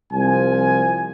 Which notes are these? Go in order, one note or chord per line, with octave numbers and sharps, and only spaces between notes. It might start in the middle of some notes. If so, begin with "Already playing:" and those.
C2 F3 G#5